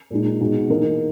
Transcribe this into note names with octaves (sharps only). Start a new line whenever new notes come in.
A#2 G#3 D#4
B2 G#3 D#4 F#4
E3 A#3 D#4 A#4